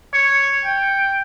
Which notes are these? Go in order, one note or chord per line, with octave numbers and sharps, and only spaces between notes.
C#5
G5